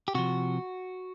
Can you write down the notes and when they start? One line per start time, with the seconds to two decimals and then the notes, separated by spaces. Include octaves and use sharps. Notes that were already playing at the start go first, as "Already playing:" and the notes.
0.08 G4
0.15 C3 F3 F#4